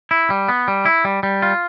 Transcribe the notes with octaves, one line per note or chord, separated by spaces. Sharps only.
E4
G3
B3
G3
E4
G3
G3
F4